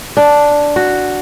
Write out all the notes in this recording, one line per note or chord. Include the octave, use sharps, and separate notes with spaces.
D4
F#4